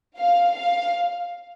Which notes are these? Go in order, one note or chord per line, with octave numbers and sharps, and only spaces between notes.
F5
F5